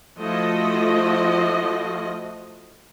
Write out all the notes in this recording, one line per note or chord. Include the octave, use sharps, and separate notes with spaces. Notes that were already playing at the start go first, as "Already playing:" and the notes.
F3 A3 E4 F#4 D#5